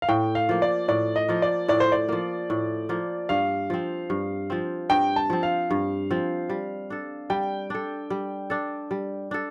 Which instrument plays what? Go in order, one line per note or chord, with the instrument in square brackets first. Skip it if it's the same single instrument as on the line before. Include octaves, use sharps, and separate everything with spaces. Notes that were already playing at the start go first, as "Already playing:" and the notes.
[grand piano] F5
[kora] A2 [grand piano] G5
[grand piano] F5
[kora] F3 A#3
[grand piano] D5
[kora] A2 [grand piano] D5
[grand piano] D#5
[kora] F3 A#3
[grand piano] D5
[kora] A2 [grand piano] D5
[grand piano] C5
D5
[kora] F3 A#3
A2
F3 A#3
[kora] G2 [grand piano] F5
[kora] F3 C4
G2
F3 C4
[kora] G2 [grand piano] G5
[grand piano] A5
[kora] F3 C4
[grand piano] F5
[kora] G2
F3 C4
G3
D4 A4
[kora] G3 [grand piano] G5
[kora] D4 A4
G3
D4 A4
G3
D4 A4